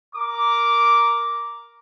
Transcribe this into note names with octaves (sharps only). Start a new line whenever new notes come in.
A#4 D6